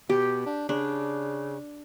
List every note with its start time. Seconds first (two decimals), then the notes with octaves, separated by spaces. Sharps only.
0.10 B2 G4
0.46 D4
0.69 C#3 D4